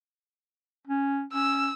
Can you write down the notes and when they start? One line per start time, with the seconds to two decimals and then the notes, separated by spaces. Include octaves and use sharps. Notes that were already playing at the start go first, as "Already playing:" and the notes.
0.87 C#4
1.33 C#4 E6